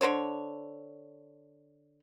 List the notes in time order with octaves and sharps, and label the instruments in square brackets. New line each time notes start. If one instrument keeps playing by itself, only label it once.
[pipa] D3 A#4 C5 C#5